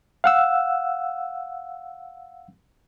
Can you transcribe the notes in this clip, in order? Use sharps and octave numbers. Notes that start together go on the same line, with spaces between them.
F5 F#5 E6